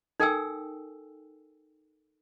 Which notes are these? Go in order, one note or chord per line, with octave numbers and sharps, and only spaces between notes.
D#4 A4 A#4 G5 G#5 E6